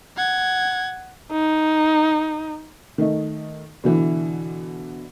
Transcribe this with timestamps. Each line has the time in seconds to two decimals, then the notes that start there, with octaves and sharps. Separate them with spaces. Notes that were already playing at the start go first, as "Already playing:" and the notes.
0.16 F#5 G#6
1.32 D#4
2.98 D#3 A3 D#4
3.84 B2 D3 E3